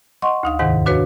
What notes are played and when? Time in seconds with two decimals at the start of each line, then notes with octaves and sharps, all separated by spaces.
0.22 D#5 F#5 C6 C#6
0.43 D2 D#4 F5
0.59 E2 G#2 C3 D#3 F#5
0.86 D4 F#4 B4 C#5 F5